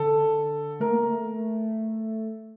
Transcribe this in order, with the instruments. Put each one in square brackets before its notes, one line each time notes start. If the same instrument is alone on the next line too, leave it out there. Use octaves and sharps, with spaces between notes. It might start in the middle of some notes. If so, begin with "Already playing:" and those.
Already playing: [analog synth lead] D3 [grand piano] A4
[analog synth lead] A3 [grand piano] A#4
[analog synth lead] A#3
A3